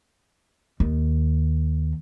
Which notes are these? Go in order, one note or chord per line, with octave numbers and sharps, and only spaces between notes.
D#2